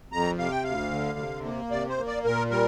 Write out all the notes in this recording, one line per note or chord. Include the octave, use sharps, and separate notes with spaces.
F2 A#5
C3 F5
G5
D2 F5
D3
C3
A#3
C3 D5
C5
A#3
D5
A#2 A#4
G3 A#4